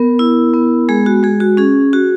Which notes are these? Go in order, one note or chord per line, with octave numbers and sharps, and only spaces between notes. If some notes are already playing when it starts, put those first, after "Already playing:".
Already playing: B3 A#4
E4
B3
G#3 G#4
F#4
G#3 G#4
F#4
C#4 G#4
F#4